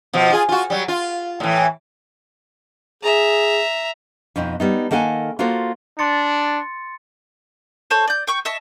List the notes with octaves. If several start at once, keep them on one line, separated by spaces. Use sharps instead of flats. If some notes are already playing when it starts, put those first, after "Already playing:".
B2 F3
F4 G#4
F4 F#4
F#3 G3
F4
A2 E3
G#4 E5 A#5
F2 B2 C4 D#4
G3 B3 D#4
D#3 A#3 A4 F#5 G#5
A#3 F4 F#4 A4 C5
D4 C6 A6 C#7
A4 C5 C#5 A5
D5 G6
G5 C#6 G6
D#5 E5 A5 C#6